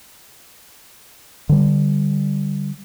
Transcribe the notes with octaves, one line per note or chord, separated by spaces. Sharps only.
D3 G3